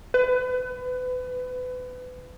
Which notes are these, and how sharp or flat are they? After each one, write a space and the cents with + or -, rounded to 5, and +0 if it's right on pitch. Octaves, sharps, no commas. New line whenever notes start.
B4 +30